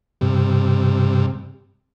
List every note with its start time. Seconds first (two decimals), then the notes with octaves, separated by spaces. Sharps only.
0.21 G2 C3